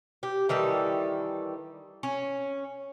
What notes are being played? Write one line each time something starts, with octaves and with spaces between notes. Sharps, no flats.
G4
D#3 E3 G3 A4
C#4